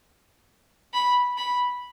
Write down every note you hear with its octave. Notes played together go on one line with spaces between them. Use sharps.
B5
B5